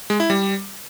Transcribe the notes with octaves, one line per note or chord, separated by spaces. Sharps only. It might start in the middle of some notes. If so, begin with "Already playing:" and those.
G#3
E4
G3